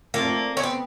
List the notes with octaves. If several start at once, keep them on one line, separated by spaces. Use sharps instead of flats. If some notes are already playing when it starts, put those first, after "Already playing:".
A3 A#3 C4 F4 A4 D5
B3 C#4
C4